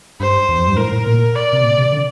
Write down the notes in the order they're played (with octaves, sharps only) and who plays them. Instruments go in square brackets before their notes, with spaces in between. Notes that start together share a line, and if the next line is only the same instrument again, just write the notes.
[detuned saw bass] G2 [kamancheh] C5
[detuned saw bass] E2
F2
G2
[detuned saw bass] A2 [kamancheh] A#4
[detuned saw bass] A2
A#2
[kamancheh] D5
[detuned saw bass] C3
A#2
C3
D3